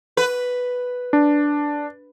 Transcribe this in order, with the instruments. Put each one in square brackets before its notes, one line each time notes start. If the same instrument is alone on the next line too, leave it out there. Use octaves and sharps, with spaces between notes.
[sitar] B4
[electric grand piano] D4